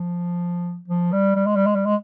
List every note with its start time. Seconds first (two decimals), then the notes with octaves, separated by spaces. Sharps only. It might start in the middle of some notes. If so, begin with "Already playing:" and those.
Already playing: F3
0.88 F3
1.12 G3
1.36 G3
1.46 G#3
1.56 G3
1.66 G#3
1.75 G3
1.85 G#3